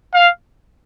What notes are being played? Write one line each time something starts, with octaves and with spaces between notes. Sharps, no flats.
F5